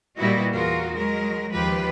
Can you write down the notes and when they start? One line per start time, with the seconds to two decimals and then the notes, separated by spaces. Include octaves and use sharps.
0.16 A#2 G3 B3 E4 F#4 D#5
0.52 E2 F4 F#4 G#4 A#4
0.94 F#3 G#3 A#4
1.53 D#2 F3 F4 G4 B4